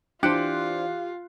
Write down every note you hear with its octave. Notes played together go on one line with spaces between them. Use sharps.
E3 D4 F4 G4 C5 F#6 C#7